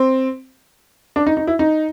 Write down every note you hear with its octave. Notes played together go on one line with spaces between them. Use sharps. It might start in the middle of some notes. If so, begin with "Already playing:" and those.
Already playing: C4
D4
D#4
D#4
E4
D#4